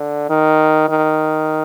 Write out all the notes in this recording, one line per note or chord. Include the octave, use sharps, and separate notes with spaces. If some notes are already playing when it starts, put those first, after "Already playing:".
Already playing: D3
D#3
D#3